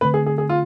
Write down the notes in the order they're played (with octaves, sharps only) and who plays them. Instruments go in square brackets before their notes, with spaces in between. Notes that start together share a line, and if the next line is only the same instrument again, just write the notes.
[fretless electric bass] D3 A3 C4 [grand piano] B4
[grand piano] G#4
G#4
G#4
F4